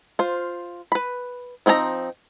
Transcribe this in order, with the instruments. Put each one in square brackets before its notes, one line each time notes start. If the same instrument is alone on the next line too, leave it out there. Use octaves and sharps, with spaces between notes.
[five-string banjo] F4 C5
B4 B5
F3 C4 D#4 E4 A#5